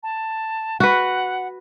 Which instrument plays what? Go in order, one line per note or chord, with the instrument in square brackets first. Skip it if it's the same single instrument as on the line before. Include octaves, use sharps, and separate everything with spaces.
[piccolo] A5
[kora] F#4 B4 [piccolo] F#5